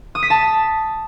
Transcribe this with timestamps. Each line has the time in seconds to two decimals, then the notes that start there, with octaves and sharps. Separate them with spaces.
0.15 D#6
0.23 B6
0.30 A5